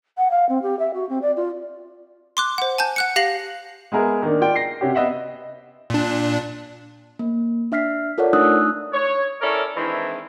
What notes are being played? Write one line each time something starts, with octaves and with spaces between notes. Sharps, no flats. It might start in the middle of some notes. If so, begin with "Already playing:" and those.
F#5
F5
C4
G4
E5
F#4
C4
D5
F4
C6 D6 F#6
C5 F#5
G#5 A5 G6
F#5 F#6 C#7
G4 F5 A#6 C7 F#7
G#3 B3 G#4 A#4 E5
D#3 A#3 D4
F4 D5 G5
A#6 C7
C3 C#4 F#4 G4
B3 D#5 E5 F#5
A#2 D4
A#3
D4 E5 F6 B6 C7
F4 A4 A#4 C#5 D5 F#5
A3 D4 D#4 D#6 E6 F#6
C#5
C#4 E4 A4 A#4 C#5 D5
D#3 E3 G#3 C4 D4 E4